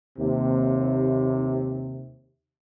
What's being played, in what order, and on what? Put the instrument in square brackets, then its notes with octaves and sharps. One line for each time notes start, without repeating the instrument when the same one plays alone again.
[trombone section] D#2 C3